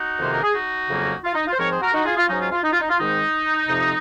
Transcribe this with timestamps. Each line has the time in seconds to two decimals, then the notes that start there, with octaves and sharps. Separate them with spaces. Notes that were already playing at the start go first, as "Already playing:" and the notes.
Already playing: D#4 F#4
0.18 F2 C3 D#3 A#3 C#4 C5
0.32 A#4
0.43 G#4
0.53 D#4 F#4
0.88 F2 C#3 F#3 A#3 C#4
1.24 F4
1.35 D#4
1.47 F4
1.53 C5
1.58 G#2 F3 C4 A#4 C#5
1.70 G#4 C5
1.81 F#4 A#4
1.93 D#4 F#4
2.05 F4 G#4
2.17 F4
2.28 G#2 F#3 C#4 D#4
2.40 F4
2.51 F4
2.63 D#4
2.72 F4
2.81 D#4
2.89 F4
2.98 G#2 D#3 G#3 C4 D#4
3.68 F2 C3 F3 C4